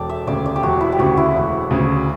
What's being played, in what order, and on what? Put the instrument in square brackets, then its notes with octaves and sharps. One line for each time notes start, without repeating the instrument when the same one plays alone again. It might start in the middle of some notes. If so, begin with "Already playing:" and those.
Already playing: [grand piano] E1 [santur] G4 A4 D5
[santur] E5
[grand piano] D2 C#3 [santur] D5
[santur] D5
G4
[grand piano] E1 [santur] F#4
[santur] E4
G4
[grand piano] D2 C#3 [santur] F#4
[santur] E4
[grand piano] E1
D2 C#3